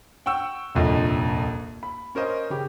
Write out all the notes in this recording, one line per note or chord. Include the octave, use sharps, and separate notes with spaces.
F#5 G5 C#6 E6
D#1 C2 F2 F3 D4 D#5
B5
C#4 A#4 C5 D#5
C#3 G4